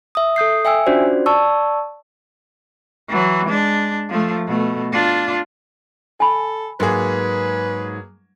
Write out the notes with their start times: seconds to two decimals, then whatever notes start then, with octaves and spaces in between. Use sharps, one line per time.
0.15 E5 D#6
0.36 A4 D#6 G6 C7
0.65 E5 G5 G#5 E6
0.86 C#4 D4 F4 F#4 C5 D5
1.26 D5 A5 C#6 E6
3.08 E3 F#3
3.47 G#3 D4
4.09 F3 A3
4.47 B2 A3
4.92 D4 F4
6.20 A4 G#5 B5
6.80 G#2 F#3 A#3 G#4 B4